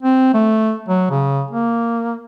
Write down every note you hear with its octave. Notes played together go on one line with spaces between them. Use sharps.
C4
A3
F#3
C#3
A#3